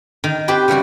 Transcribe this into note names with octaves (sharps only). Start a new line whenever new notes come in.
D#3
C4 G4 B4
C#3 E3 G3 F#4